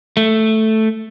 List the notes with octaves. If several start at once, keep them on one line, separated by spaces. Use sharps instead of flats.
A3